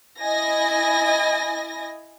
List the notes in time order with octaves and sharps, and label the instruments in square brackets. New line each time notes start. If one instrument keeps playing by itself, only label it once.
[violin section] E4 D#5 G#5 A#6